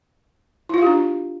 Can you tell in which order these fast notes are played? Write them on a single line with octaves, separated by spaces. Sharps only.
E4 F4 F5 G4 D4